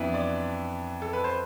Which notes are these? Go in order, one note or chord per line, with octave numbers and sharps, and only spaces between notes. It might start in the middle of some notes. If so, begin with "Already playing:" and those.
Already playing: F2 E3 B3 D4 E5
D5
A4
B4
C5